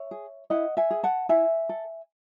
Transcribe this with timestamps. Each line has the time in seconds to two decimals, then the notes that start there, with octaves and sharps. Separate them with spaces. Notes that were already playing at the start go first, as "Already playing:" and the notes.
Already playing: C#5 E5
0.11 G#4
0.50 E4 D#5 F#5
0.77 E5 G#5
0.91 G#4
1.03 F#5 A5
1.29 E4 E5 G#5
1.69 A4